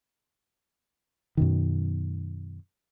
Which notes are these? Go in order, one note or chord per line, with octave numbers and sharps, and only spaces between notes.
F#2 B2 D#3